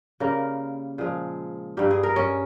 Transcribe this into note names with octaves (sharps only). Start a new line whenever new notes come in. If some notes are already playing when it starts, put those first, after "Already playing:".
C#3 G3 A#3 A#4
A#2 F3 G#3 G#4
G2 G3 A#3 G4
G#4
A#4
C#4